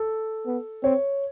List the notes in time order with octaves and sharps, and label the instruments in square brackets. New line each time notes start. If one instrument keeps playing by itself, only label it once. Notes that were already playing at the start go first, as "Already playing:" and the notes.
Already playing: [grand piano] A4
[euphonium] B3
[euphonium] C4 [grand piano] C#5